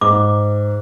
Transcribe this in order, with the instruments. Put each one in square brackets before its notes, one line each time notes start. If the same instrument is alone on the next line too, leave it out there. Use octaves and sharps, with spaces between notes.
[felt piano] G#2 [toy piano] D6